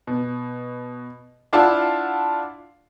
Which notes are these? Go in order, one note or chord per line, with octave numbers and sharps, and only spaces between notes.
B2
D4 E4 F4 F5 F#5 A5